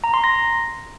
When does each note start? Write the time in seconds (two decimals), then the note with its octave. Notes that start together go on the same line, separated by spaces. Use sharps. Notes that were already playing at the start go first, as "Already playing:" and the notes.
0.04 A#5
0.14 C6
0.24 A#6